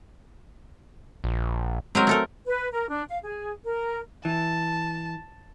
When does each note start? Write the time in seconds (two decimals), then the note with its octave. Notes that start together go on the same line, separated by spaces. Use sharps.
1.24 A#1
1.95 F#3 G#3 C4 A#4
2.07 A3 A4 A#4
2.45 B4
2.72 A#4
2.89 D4
3.09 F5
3.23 G#4
3.63 A#4
4.25 E3 A5